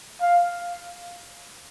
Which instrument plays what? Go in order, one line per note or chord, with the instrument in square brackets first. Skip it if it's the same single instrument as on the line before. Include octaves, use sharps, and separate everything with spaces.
[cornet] F5